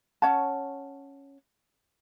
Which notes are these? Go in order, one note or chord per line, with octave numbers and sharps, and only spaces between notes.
C#4 C#5 F#5 A5